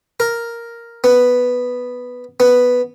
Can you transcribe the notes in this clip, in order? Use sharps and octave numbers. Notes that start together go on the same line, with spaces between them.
A#4
B3
B3